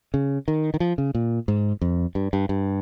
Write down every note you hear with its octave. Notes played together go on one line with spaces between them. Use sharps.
C#3
D#3
D#3
F3
C#3
A#2
G#2
F2
G2
G2
G2